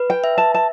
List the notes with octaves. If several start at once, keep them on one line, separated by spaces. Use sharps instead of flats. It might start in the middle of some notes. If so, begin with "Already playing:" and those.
Already playing: B4
G5
E5
A5
A5